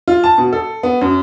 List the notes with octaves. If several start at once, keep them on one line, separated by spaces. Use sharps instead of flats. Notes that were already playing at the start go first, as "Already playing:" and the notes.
F4
A5
B2
A4
B3
F#2